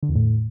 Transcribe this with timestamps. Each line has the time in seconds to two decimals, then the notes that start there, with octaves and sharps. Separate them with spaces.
0.02 D3
0.09 E2
0.15 A2